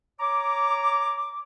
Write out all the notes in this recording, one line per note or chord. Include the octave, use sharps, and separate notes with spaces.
C#5 A#5 D6